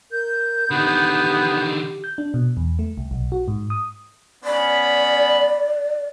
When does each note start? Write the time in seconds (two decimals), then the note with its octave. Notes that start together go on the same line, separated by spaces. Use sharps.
0.11 A#4 G6
0.71 D3 D#3 B3 G4
2.04 G6
2.18 D4
2.34 B2
2.57 E2
2.79 A3
2.98 C2
3.11 B1
3.32 F#4
3.48 G#2
3.70 D#6
4.44 B3 C#4 D5 B5